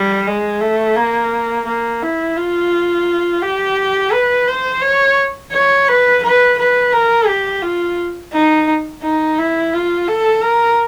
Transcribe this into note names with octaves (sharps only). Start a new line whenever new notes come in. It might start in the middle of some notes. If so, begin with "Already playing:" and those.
Already playing: G3
G#3
A3
A#3
A#3
E4
F4
G4
B4
C5
C#5
C#5
B4
B4
B4
A#4
G4
F4
D#4
D#4
E4
F4
A4
A#4